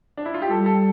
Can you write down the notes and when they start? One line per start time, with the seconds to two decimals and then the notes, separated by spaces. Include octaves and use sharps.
0.17 D4
0.25 E4
0.34 F4
0.42 G4
0.50 G3 A4
0.66 A4